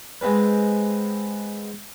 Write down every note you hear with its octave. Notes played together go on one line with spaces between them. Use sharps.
G#3 B3 C4 B4